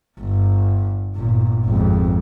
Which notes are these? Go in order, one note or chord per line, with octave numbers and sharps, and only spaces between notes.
G1
G1 A#2
G#1 F2